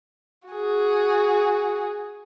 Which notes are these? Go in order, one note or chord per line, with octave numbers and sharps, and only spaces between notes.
F#4 G#4